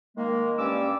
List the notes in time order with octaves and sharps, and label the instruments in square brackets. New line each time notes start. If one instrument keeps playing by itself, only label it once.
[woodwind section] D#3 G#3 A#3
G2 C#4 D5 D6 E6